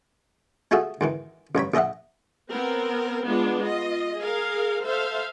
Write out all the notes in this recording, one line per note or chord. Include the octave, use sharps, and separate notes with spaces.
G#3 A3 F4 F#4 G#4 E5
G#2 D#3 E3
A1 G2 C#5 B5
A#1 G#4 D#5 E5 F#5
B3 C4 A#4
G#3 B3 D4 F4
F4 D#5
G#4 A#4 F5
A4 C5 E5 F5